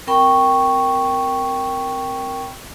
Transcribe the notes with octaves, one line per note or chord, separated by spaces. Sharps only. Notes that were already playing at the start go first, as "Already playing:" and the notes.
C4 A#4 G5 B5 C#6